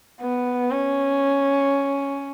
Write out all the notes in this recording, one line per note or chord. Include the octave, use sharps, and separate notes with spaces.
B3
C#4